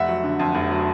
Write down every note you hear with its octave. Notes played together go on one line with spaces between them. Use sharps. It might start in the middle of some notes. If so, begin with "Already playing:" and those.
Already playing: F1 E5 F#5
F#3
D3
F2
F1
F#3